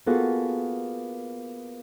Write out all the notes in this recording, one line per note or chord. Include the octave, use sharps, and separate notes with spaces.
A#3 B3 F4 F#4 G#4 A4